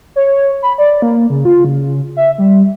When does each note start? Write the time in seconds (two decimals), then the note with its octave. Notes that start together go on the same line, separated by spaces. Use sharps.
0.16 C#5
0.63 B5
0.78 D5
1.02 A#3
1.30 C#3
1.45 F4
1.65 C#3
2.17 E5
2.38 G3